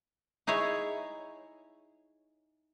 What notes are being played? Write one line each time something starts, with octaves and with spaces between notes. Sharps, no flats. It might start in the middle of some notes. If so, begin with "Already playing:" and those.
D#4 E4 G#4 C#5